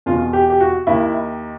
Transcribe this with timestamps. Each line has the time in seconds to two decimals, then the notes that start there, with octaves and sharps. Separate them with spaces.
0.06 E2 B2 F4
0.33 G4
0.50 G4
0.60 F#4
0.87 D#2 D#3 E4